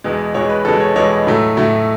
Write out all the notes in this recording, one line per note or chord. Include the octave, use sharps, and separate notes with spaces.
E2 B2 G#3
E2 B2 G#3 C#5
B4
E2 B2 G#3 A4
C#5
E2 B2 G#3 C#5
A2 F#3 A3
A2 F#3 A3